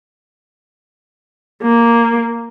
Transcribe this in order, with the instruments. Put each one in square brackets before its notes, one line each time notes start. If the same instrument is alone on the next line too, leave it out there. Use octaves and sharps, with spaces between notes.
[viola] A#3